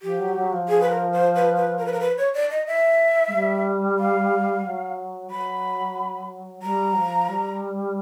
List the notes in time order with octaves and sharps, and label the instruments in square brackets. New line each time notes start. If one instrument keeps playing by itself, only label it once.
[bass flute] F3 [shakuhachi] G4
[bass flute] F#3
F#3
F3
[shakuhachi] G#4
B4
A#4
C5
B4
B4
A#4
B4
A#4
B4
C#5
D5
D#5
E5
[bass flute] G#3
G3
[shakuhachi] F5
[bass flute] F#3
[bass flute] F#3 [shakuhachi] B5
[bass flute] G3 [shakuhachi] A#5
[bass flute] F#3
F3
G3